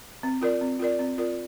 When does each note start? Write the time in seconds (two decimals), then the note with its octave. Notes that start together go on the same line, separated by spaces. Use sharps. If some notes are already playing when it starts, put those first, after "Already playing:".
0.23 C4
0.42 F4 A#4 D5
0.61 C4
0.79 F4 A#4 D5
0.99 C4
1.18 F4 A#4 D5